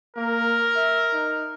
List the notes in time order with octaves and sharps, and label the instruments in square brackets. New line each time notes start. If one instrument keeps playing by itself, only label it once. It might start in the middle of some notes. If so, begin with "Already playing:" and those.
[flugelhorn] A#3 [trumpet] A#4
[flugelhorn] E5
D#4